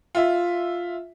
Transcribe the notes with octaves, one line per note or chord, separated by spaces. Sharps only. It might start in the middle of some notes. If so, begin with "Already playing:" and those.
F4 E5